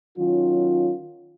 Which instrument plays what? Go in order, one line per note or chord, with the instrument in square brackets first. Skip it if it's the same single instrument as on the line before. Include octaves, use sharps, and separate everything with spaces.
[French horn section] D#3 F#3 C#4 F4